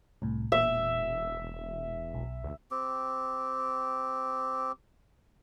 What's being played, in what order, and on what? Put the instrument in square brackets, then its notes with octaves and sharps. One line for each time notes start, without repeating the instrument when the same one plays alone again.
[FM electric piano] C2 A2
[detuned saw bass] E1 [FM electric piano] A#2 [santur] E5
[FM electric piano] B1
[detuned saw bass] D2
[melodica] C4 G4